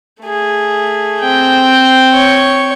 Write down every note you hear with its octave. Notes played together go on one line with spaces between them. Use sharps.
A3 G#4
C4 G5
C#5 C#6